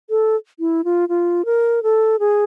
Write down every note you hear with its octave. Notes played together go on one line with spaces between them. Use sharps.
A4
E4
F4
F4
A#4
A4
G#4